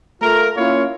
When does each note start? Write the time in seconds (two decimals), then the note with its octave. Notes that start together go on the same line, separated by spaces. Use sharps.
0.21 A3 F4 A#4
0.57 A#3 C#4 E4 F4 C#5 F5